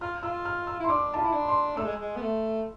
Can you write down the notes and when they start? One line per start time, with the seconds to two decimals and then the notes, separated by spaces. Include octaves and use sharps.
0.01 F4 F6
0.23 F4 E6
0.45 F6
0.67 E6
0.80 E4
0.84 C6
0.89 D4 D6
1.14 A5
1.16 F4 B5
1.25 E4
1.33 D4
1.49 C6
1.77 A3 E6
1.86 G#3
2.01 G#3
2.16 B3
2.21 A3